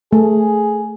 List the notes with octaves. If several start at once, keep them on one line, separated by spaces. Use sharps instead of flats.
A3 G#4